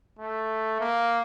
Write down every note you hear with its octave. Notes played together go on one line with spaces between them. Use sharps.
A3
A#3